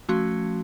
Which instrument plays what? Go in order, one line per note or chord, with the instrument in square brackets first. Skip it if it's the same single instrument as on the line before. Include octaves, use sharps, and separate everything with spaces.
[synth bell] F3 A3 C#4 F#4